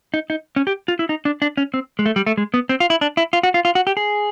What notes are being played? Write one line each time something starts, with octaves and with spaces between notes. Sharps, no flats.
D#4
D#4
C#4
G4
F4
E4
D#4
D4
D4
C#4
C4
G#3
A3
G3
A3
G#3
B3
C4
F4
E4
D4
E4
F4
F#4
F4
F4
F#4
G4
G#4